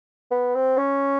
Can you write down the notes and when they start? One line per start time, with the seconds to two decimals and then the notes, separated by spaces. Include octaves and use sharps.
0.31 B3
0.55 C4
0.77 C#4